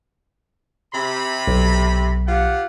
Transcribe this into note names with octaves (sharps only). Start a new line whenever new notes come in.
C3 B5
B1
F4 G4 F#5